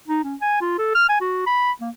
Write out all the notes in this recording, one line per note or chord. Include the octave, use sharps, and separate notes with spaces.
D#4
C#4
G#5
F4
A4
F6
G#5
F#4
B5
A#3